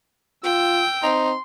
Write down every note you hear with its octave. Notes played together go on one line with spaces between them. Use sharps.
F4 G5 E6
C4 D#4 C6